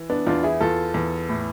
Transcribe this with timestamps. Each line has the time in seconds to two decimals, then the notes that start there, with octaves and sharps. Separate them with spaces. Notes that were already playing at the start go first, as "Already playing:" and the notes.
Already playing: E3
0.10 B3 D4
0.27 E2 D4 F4
0.43 E4 G#4
0.61 E2 F4 A4
0.94 E2
1.29 A2